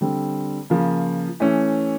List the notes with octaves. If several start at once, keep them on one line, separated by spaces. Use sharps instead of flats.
D3 G3 C4
C#3 F3 A#3
E3 A3 C#4